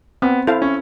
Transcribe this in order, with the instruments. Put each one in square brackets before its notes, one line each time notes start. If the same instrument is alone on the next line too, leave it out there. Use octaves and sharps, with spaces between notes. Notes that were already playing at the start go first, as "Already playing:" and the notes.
[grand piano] B3 [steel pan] C4
[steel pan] E4 A4 C5 F5
[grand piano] C#4